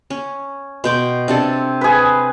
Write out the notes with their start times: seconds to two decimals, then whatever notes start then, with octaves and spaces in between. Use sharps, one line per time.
0.10 C#4
0.84 B2 G5 C6 D6
1.28 C3 D4 A4
1.81 G#4 B4